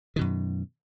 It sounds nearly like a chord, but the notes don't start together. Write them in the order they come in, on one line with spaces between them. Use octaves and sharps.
D#3 B2 F#2